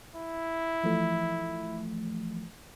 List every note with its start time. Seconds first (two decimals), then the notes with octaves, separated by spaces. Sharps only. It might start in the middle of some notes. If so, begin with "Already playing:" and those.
0.16 E4
0.84 E3 F3 A3